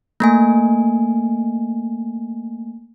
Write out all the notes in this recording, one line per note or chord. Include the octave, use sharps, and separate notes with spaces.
A3 A#3 G#5